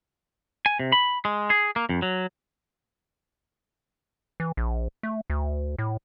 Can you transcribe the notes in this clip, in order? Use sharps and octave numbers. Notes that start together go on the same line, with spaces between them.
G#5
C3
B5
G#3
G#4
A#3
F2
F#3
E3
A#1
A3
D2
A2